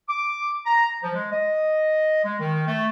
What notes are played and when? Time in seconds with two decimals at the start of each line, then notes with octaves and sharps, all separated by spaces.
0.09 D6
0.66 A#5
1.03 F3
1.14 G#3
1.32 D#5
2.24 G#3
2.40 D#3
2.67 A3